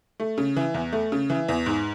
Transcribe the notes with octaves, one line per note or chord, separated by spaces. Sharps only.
A3
C#3
E3
E2
A3
C#3
E3
E2
G#2